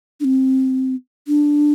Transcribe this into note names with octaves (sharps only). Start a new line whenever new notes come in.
D4
C4
D4